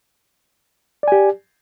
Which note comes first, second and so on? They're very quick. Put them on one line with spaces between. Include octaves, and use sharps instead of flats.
D5 G#5 G4